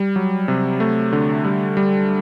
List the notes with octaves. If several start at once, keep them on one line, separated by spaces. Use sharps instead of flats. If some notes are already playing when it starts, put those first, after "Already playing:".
Already playing: G3
F#3
C3
A3
D3
G3
G3